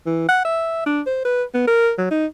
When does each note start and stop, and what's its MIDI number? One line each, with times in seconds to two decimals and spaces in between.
0.06 0.28 52
0.29 0.40 78
0.45 0.82 76
0.86 1.01 62
1.06 1.20 72
1.25 1.44 71
1.54 1.63 59
1.67 1.92 70
1.98 2.08 54
2.11 2.26 63